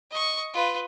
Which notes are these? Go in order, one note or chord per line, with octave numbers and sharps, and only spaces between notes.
D#5 C#6
F4 B4